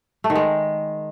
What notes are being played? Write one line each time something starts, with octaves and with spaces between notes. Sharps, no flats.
A3
D#3
G#3